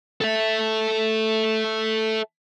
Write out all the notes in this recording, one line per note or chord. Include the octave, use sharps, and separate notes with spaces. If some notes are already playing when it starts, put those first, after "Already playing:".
A4 E5